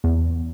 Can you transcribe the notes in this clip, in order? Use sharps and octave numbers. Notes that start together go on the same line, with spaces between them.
E2